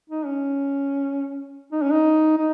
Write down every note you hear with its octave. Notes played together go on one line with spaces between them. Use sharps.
D#4
C#4
D#4
C#4
D#4
D#4